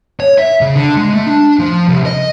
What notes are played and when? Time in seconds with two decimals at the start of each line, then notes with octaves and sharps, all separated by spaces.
0.20 C#5
0.38 E5
0.61 C#3
0.76 D3
0.96 G#3
1.13 A3
1.27 D4
1.59 F3
1.88 C2
2.06 D#5